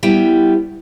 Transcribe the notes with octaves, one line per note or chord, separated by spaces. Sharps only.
G3 B3 E4 G5